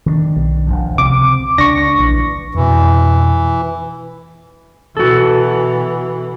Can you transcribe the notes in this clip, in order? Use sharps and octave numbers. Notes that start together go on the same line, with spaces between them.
D#3 C4 D4
B1
D#1 E2 F3
C#2 C3 C4 D6
C#2 D4 C#6 A#6
A#1 E3
F2 B2 E3
B2 E3 F#4 A4